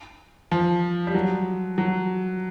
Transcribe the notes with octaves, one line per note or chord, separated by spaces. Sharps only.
F3
G3
F#3
F#3